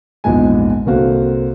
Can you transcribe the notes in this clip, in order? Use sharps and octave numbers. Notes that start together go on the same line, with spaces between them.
A#1 E2 G#2 G#3 G#5
C2 D3 A#3 C4 F#4 F5